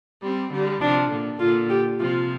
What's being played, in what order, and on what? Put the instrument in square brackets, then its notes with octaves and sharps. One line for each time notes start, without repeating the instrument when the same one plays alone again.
[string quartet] G3 C4
D3 G3
[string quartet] C3 F3 [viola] D4
[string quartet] A#2 D3
[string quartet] A#2 D3 [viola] F4
[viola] G4
[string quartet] C3 F3 [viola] F4